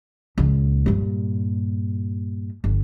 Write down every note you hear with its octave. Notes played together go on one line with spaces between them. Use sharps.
C#2 A#2
G2 A#2
G1